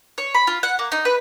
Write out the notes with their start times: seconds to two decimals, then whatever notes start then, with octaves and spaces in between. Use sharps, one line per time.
0.18 C#5
0.35 B5
0.47 F4
0.63 F#5
0.79 A#3
0.92 D#4
1.05 B4